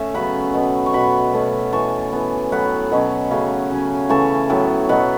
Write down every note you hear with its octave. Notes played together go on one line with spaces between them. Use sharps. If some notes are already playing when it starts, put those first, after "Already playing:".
Already playing: A3 C#4 E5
C#3 F#3 B3 F#5 B5
B2 B3
C#6
B2 B3 F#5 B5
B2 A3 C#4
E3 B3 A5 C#6
E3 B3
A2 F#3 B3 F#5 B5
B2 F#3 C#4
C#3 F#3 A3 C#4
C#3 F#3 C#4
C#3 E3 A3 A5 C#6
A2 F#3 B3
B2 F#3 B3 F#5 B5